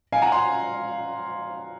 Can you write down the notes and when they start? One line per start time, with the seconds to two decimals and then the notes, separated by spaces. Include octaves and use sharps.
0.12 F5 G#5
0.22 F#5 A#5
0.32 G#5 C6